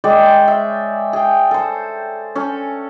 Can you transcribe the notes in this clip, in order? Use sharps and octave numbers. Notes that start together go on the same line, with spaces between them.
G#3 C#5 D5 G5
E5
G#4 G5
A4 C5
C#4 A4